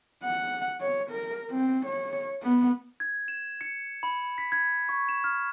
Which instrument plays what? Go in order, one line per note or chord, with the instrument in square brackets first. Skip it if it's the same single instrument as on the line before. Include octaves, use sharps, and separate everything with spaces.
[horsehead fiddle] F#5
C#5
A#4
C4
C#5
B3
[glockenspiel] G#6
E7
C#7
B5
B6
G#6
C#6
E7
F6